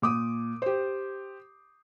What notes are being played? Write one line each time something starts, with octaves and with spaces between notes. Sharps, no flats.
A#2 D6 D#6
G4 C5